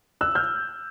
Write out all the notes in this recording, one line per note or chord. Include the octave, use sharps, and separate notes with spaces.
E6 F#6
F6 G6